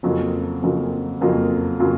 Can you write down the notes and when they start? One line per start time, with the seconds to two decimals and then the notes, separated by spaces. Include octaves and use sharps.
0.03 F2 C#3 F#3 A#3 F4
0.62 F2 C#3 F#3 A#3 F4
1.21 F2 C#3 F#3 A#3 F4
1.80 C#3 F#3 A#3 F4